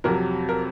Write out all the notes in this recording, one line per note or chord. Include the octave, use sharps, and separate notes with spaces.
F2 C3 F#3 A#4
A#4